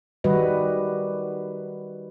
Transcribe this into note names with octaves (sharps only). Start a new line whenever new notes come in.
D#3 G3 F#4 B4 D#5